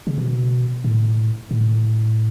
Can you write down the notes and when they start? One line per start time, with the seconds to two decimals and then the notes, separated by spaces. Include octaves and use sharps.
0.07 C#3
0.18 B2
0.84 A2
1.51 A2